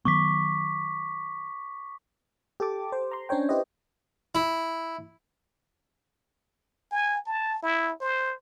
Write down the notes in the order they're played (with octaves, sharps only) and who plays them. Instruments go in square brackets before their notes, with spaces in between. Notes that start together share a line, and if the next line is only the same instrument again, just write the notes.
[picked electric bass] D#3 F#3 B3 [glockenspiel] C#6 D6 B6
[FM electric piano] G4 A4 A5 D6
C5
A#5 C6
C#4 D4 C5 C#5 G5
E4 G4 B4 C5 D#5
[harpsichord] E4
[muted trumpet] G#5
A5
E4
C5